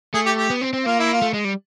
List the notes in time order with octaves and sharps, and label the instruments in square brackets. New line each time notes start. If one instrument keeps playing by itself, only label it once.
[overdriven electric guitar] A3 [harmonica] G#4
[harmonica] G4
G4
[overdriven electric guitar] B3
C4
C4
[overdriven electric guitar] A#3 [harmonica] F4
[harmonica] E4
F4
[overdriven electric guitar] A3
G#3
G3